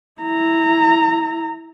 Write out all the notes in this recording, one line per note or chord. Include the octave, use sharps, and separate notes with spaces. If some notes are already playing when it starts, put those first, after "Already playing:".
E4 A#5